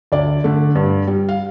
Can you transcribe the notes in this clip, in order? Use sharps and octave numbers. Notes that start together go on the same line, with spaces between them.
D2 D5
D3 A3
G2
G3
F5